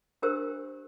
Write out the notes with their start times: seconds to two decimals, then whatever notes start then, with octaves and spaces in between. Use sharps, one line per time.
0.22 D4 G4 A#4 C5 E6